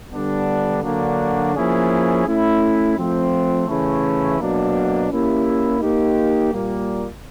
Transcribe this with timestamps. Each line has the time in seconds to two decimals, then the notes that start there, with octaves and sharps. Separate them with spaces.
0.11 D3 G3 B3 D4
0.82 D3 F#3 A#3 D4 F#4
1.54 F3 A#3 C#4 E4 G#4
2.25 A3 C#4 E4
2.95 F3 A3 C4 F4
3.66 C#3 E3 A3 C#4 E4
4.37 B2 F#3 A#3 D4
5.09 A#3 C#4 E4 G4
5.80 A#3 D#4 G4
6.51 A#2 G3 A#3